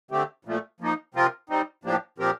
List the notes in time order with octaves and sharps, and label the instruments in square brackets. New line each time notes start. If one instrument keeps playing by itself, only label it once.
[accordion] D3 A3 C4 G4
A#2 F3 A3
F3 A#3 D#4
C3 F3 C4 F4 A#4
G3 C4 D#4
A2 F3 A#3 D4 G4
A#2 F3 C4 G4 A#4